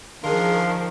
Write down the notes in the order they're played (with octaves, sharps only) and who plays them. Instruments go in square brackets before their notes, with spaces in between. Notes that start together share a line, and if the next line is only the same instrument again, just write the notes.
[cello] D#3 F3 [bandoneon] D4 F5 C6 [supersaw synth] G#4 A#4